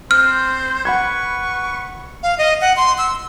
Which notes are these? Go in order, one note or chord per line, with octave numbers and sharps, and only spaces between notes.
C4 C5 F6
B4 F#5 B5 C#6 G#6
F5
D#5
F#5
C6
E6